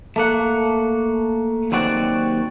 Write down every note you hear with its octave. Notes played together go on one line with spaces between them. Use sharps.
A3 A#3 F#5
D#2 F#3 C4 F#4 D5